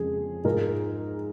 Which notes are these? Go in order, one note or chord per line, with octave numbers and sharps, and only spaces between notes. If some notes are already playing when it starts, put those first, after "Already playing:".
Already playing: F2 C#3 F3 G#3 G#4
G#2 F3 G#3 A#4